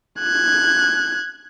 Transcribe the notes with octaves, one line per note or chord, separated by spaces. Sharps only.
F#6 G#6